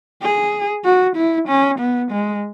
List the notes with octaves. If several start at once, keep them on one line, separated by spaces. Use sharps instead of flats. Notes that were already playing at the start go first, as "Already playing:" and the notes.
G#4
F#4
E4
C#4
B3
G#3